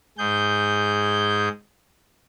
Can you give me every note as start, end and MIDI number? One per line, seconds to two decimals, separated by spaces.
0.18 1.48 44
0.18 1.48 68
0.18 1.48 91